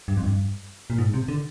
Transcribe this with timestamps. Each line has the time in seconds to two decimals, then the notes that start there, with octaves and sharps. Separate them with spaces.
0.08 G2
0.17 F2
0.23 G2
0.90 A#2
0.98 G#2
1.14 C3
1.28 D3